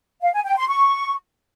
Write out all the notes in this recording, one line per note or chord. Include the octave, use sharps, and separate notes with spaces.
F5
G#5
G5
C6
C#6